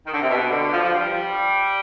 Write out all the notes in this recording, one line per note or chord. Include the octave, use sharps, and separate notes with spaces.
D#3
D3
C3
B2
D3
F3
F3
G3